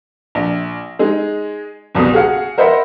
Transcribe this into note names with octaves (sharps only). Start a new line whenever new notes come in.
A#1
G#3 D#4 G#4
F#1 C2 B2 D#6
F#4 G#4 F5 F#5
A#4 C5 D#5 E5 F#5 B5